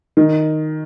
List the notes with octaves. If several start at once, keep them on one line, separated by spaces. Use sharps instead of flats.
D#3